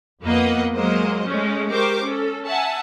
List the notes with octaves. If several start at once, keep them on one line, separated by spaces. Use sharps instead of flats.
F2 A#3 B3 B4 D#5 F#5
F#3 G#3 A#3 C5 D#5
G#3 A3 C#4
G4 A#4 C5 C#6 D6
C#4 A4
E5 F#5 G#5 A5